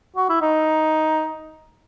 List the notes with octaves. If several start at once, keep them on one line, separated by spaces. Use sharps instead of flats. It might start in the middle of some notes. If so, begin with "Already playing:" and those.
F#4
E4
D#4